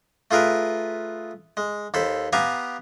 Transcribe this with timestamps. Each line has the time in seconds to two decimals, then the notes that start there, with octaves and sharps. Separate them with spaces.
0.31 A3 F4 G#4 A#4 B4
1.57 G#3
1.94 D#2 A4 C5 B5
2.33 B3 G4 F5 G#5 A#5